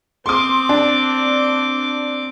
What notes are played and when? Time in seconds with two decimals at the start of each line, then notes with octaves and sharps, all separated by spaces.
0.26 C4 C6 D6 D#6
0.69 D4